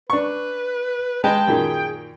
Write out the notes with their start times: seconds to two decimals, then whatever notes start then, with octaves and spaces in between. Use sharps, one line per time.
0.10 D4 B4 C#6
1.24 G#3 B4 G5 A5
1.47 F#2 A#2 D#3 G#4